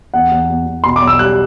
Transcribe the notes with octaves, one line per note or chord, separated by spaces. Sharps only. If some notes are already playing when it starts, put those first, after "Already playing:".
E2 F#5
E2
E2
E2
B2 C6
D6
B1
E6
G3 F#6